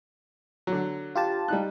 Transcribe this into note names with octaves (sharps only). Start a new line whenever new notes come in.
D3 F#3
F4 G4 A5
G3 D#4 F#6